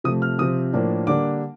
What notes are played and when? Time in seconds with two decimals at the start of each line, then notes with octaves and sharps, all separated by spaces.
0.04 C3 F3 A3 D#6
0.22 F6
0.39 C3 F3 C4 D#6
0.73 A2 F3 A#3 D4
1.07 D3 G3 A#3 D4 D6